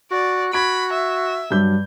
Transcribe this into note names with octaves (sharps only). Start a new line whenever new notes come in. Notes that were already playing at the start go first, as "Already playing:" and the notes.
F#4 D5
F#4 B5 G#6 D7
E5
G2 F#3 G6